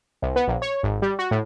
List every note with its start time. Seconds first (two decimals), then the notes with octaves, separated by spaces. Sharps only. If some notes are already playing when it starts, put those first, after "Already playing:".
0.22 C2
0.36 B3
0.48 A#1
0.62 C#5
0.83 G#1
1.02 G3
1.19 F#4
1.31 A2